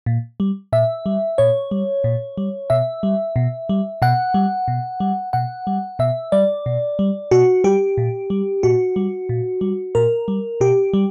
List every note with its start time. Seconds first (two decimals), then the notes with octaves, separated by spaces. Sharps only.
0.06 A#2
0.40 G3
0.73 A#2 E5
1.06 G3
1.38 A#2 C#5
1.71 G3
2.04 A#2
2.37 G3
2.70 B2 E5
3.03 G3
3.36 B2
3.69 G3
4.02 B2 F#5
4.34 G3
4.68 B2
5.00 G3
5.33 B2 F#5
5.67 G3
5.99 B2 E5
6.32 G3 D5
6.66 B2
6.99 G3
7.31 B2 F#4
7.64 G3 G4
7.98 A#2
8.30 G3
8.63 A#2 F#4
8.96 G3
9.29 A#2
9.61 G3
9.95 A#2 A#4
10.28 G3
10.61 B2 G4
10.93 G3